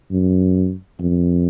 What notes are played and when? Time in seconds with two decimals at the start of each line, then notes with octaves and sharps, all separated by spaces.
0.11 F#2
0.99 F2